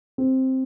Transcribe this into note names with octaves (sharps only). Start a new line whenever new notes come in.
C4